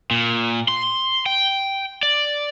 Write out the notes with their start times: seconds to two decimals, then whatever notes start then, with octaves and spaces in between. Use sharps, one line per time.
0.11 A#2
0.68 C6
1.26 G5
2.03 D5